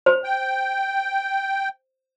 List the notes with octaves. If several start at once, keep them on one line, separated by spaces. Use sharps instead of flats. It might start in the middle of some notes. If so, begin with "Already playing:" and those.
C5
G5